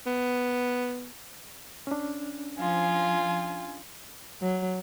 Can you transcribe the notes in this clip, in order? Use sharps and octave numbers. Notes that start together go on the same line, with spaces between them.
B3
C#4 D4
F3 F4 G#5
F#3